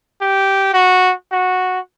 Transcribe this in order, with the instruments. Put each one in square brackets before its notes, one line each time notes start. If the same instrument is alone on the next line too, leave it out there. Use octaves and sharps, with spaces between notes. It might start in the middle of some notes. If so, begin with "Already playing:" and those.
[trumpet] G4
F#4
F#4